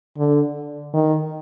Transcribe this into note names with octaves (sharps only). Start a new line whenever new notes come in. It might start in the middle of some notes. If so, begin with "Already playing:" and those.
D3
D#3